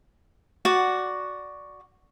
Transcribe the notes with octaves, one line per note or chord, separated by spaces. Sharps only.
F#4 D5 F#5